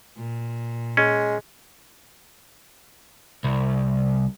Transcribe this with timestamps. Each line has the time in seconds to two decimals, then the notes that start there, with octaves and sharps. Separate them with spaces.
0.17 A#2
0.97 G#3 C#4
3.44 C2